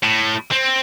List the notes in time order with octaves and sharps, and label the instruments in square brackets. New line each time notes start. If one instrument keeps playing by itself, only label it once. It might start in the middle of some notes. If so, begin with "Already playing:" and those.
[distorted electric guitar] A2
C4